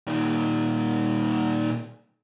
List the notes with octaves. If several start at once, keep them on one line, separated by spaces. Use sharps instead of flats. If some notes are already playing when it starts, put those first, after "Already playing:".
A#2 D#3